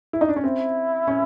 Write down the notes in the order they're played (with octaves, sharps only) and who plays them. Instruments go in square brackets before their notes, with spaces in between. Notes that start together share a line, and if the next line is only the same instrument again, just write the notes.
[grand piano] E4
D#4
D4
C#4
[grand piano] C4 [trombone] E4
[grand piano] C#4